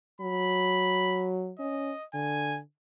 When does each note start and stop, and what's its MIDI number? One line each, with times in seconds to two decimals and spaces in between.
0.21 1.52 54
0.21 1.30 83
1.59 1.93 61
1.59 2.05 75
2.14 2.61 50
2.14 2.59 80